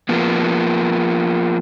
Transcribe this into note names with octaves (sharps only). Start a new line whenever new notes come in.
F3 A#3 B3